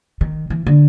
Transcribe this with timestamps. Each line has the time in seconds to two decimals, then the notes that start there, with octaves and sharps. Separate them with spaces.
0.21 D#3
0.50 E3
0.67 D3